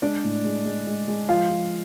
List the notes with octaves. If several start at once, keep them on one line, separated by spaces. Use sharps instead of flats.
G#3 D4 D5
A2
G#3
G#3
G#3
G#3
F3 F4 F5
F3